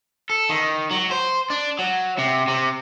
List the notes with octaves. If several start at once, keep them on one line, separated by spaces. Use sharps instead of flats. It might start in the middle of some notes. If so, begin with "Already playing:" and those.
A4
D#3
F#3
C5
D4
F#3
C3
C3